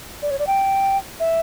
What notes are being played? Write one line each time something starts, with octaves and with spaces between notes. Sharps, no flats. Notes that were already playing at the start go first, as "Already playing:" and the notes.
D5
C#5
D5
G5
E5